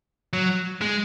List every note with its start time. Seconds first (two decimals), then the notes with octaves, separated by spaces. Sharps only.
0.33 F#3
0.81 G#3